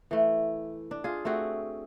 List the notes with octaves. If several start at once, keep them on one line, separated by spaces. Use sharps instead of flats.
E3 A3
D4
F4 G#4
A3 C4 F#4 G#4